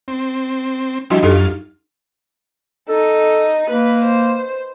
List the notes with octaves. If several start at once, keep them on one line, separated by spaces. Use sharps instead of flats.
C4
F3 G3 D4 E4 F#4 D#5
F#2 D#4 F4 G4 A4
D#4 A4
A#3 B4
C5